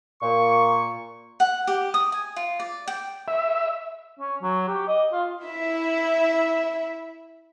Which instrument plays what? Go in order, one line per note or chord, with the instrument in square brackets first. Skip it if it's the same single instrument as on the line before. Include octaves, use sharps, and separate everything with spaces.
[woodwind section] A#2 C#6
[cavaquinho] F#5
G4
D#6
G#5
F4
D5
G5
[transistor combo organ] E5
[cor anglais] C#4
F#3
G4
D#5
F4
[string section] E4 E5